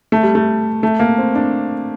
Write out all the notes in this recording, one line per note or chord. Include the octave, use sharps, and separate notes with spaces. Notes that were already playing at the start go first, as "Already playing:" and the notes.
A3
G3
A3
A3
A#3
C4
D4